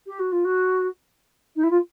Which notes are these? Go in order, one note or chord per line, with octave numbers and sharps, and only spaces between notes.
G4
F#4
F4
F#4
D#4
E4
F4